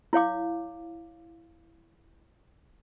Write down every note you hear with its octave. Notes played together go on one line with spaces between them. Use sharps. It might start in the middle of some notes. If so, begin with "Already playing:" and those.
E4 C#5 F5 D6